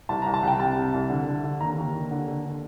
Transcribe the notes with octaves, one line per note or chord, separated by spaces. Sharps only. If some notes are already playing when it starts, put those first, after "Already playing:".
C2 A5
C2 A#5
A5
C2 G5
C3 A5
C3
C2
D3
D3
D3
D#2 A#5
D#2
D#2
D3
D3
D3